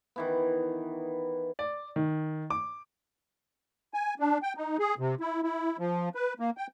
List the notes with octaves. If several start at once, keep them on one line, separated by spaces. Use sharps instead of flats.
D#3 E3 B3
D5
D#3
D6
G#5
D4
G5
D#4
G#4
C3
E4
E4
F3
B4
A#3
G5